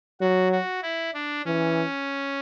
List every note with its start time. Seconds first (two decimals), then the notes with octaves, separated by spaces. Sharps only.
0.20 F#3 F#4
0.52 F#4
0.83 E4
1.14 D4
1.45 E3 C#4